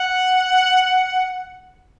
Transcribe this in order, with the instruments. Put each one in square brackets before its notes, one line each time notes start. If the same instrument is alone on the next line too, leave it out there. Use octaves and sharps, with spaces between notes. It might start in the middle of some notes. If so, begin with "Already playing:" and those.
Already playing: [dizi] F#5